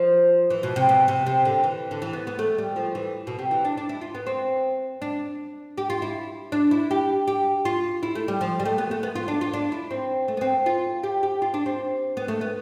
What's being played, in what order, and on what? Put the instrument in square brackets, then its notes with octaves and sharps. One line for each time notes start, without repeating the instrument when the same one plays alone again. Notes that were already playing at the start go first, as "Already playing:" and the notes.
Already playing: [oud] F3
E3
B2
C3
B2
C3
C3
D3
E3
D3
E3
B3
B3
A3
G3
F3
E3
B2
C3
E3
D4
D4
E4
F4
B3
C4
D4
G4
F4
E4
D4
E4
G4
G4
F4
E4
A3
G3
F3
G3
A3
B3
A3
B3
F4
D4
F4
D4
E4
C4
A3
B3
C4
F4
G4
G4
F4
D4
C4
B3
A3
B3